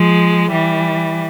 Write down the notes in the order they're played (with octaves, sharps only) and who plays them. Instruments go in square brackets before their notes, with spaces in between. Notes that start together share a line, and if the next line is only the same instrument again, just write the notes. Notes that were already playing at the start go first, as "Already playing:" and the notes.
Already playing: [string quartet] F3 G#3
E3 G3